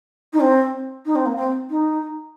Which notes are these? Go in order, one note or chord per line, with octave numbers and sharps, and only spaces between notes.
D#4
C4
D#4
C4
A#3
C4
D#4